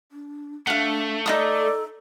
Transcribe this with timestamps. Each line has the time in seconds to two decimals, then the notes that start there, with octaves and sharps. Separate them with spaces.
0.12 D4
0.67 A3 D4 F5 F#5
1.26 D#4 F4 A4 D5 D#6